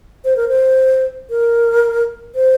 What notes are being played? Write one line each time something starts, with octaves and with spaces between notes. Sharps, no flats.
C5
A#4
C5
A#4
C5